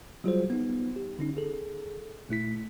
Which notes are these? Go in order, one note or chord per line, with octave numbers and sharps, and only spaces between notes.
F#3 G3 F4 F#4 G#4 C5
B3 D#4
G4
D3 C#4 D#4
G#4 A4
A#2 A3 E4 B6